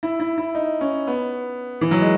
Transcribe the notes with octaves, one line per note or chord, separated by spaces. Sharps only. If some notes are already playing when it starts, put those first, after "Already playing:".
E4
E4
E4
D#4
C#4
B3
E3
F#3
G#3